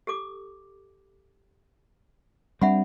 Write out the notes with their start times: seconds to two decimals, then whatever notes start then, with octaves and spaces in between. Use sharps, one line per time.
0.07 G4 A4 D6
2.61 G3 C4 D4 E5 F#5 B5